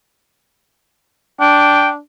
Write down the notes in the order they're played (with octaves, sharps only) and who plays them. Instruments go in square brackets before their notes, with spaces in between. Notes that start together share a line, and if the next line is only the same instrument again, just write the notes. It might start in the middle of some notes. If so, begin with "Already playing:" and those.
[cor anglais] D4 [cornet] G5